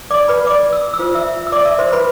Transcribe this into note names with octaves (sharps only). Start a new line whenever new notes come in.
D5 D6
B4 B5
D5 D6
E6
E6
F4 C5
E5 E6
E6
D5 D6
E5 E6
C5 C6
B4 B5